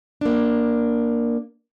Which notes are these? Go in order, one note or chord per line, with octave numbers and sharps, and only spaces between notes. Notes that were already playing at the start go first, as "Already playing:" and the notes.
A#3 D4